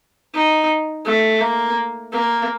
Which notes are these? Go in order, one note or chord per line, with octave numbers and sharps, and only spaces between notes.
D#4
A3
A#3
A#3